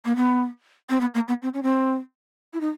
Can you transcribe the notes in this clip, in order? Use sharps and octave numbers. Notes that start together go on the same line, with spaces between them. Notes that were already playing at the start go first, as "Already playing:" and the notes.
A#3
B3
C4
B3
A#3
B3
C4
C#4
C4
E4
D#4